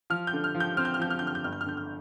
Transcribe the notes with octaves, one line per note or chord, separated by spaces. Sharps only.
F3 F6
G6
D3
F6
F3
G6
C4 F6
G6
F6
F3 G6
F6
D3 G6
F6
G6
G1 F6
G6
F6
D3 G6
F6